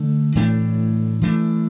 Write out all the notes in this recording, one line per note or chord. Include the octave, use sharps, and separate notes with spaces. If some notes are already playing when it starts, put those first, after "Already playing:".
Already playing: D3 A3 D4
A2 E3 A3 D4
E3 A3 D4